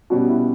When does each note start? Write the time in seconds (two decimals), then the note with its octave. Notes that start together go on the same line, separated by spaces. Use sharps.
0.10 B2 G3 C#4 F#4
0.29 E4